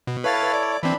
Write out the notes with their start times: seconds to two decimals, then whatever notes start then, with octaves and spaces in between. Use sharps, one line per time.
0.07 B2
0.24 E4 A4 B4 C#5 F5 A6
0.54 D5
0.83 E3 C4 D4 B5